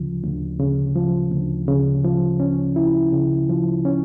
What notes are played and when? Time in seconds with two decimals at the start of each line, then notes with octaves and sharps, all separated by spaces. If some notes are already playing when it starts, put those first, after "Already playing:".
Already playing: D2 C#3 F3
0.23 D2
0.60 C#3
0.95 F3
1.31 D2
1.68 C#3
2.04 F3
2.40 C#4
2.76 E4
3.13 C#3
3.49 F3
3.85 C#4